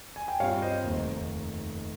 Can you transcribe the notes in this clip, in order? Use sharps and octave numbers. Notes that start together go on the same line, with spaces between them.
G#5
G5
G2 G3 C4 F4 C#5 F5
C5 D#5
F1 D#2 D#3 A#3 D#4